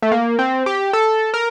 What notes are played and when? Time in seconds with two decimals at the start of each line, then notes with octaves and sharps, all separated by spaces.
0.02 A3
0.12 A#3
0.39 C4
0.66 G4
0.93 A4
1.34 A#4